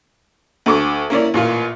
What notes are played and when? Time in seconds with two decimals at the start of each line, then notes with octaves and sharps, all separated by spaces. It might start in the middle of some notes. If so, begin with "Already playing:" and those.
0.66 D2 A4 C#6 D6
1.10 A#3 C#4 E4 D5
1.34 A1 A#2 F4